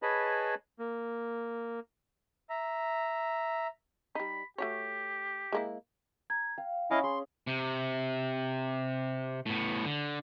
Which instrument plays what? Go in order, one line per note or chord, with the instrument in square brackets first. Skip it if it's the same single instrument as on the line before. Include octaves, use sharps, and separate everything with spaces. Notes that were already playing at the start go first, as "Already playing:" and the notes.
[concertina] G#4 B4 C#5 D#5 A5 B5
A#3
[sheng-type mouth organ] E5 A#5
[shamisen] G3 D#4 [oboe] B5
[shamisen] A3 F#4 C#5 [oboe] G4
[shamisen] G#3 A#3 E4
[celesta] A#5 G#6
[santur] F5 [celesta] G5
[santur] C#4 [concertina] E4 D#5 F5 [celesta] G#5 B5
[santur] G#4 [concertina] C6
[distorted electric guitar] C3
A2 B3
D3